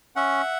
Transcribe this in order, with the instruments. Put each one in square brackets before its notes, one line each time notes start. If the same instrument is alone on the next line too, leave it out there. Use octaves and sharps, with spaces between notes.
[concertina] C#4 E5 F#5